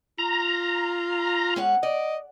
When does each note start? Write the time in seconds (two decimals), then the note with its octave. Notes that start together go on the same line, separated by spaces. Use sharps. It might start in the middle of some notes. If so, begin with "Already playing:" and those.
0.19 F4 A#5
1.56 G#3 C#4 F#5
1.83 D5 D#5